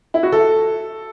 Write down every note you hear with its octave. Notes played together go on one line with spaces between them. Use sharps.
E4
F#4
A4